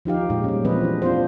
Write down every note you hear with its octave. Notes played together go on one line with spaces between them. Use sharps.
F3 D#4 G4 F5
A#2 G#3 G4
G3 C#4
E3 F3 C4 B4 D#5
D4
C4 D4 F4 C5